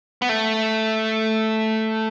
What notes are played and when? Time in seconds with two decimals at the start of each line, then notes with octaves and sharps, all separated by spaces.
0.22 B3
0.29 A3